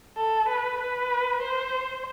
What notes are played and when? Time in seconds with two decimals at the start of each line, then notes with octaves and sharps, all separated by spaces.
0.17 A4
0.48 B4
0.80 B4
1.42 C5